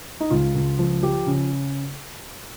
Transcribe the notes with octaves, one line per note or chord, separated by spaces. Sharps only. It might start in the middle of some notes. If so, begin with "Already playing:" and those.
D#4
C#2 F4
C#2
F3
F3 G4
C#3